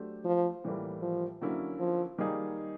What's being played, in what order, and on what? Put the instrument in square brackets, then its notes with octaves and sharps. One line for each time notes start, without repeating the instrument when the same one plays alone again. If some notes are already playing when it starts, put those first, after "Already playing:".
Already playing: [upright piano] F#3 A3 D4 G4 C5
[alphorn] F3
[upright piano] A2 E3 G3 A#3
[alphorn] F3
[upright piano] D3 F#3 A#3 C#4 E4
[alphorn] F3
[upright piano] D#3 G3 A#3 D#4 G#4